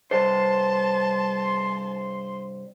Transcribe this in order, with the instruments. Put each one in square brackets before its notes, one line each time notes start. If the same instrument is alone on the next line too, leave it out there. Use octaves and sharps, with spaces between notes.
[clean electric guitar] G2 C3 C5 [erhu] A5 [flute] C6